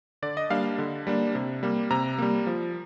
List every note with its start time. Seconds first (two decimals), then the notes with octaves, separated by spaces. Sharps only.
0.22 D3 D5
0.37 D#5
0.50 G3 A#3 D4 F5
0.79 D3
1.07 G3 A#3 D4
1.35 C3
1.63 G3 A#3
1.90 C3 A#5
2.18 G3 A#3
2.47 F3